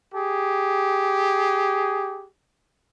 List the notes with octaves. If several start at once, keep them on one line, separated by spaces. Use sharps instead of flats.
G4 G#4